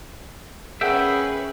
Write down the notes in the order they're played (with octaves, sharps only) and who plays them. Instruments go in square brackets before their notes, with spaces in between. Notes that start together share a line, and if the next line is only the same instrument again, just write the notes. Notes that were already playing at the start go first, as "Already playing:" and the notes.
[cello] C#4 B4 [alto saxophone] G#4 [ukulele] A#4 F#5 A5 [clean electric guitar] E5 G5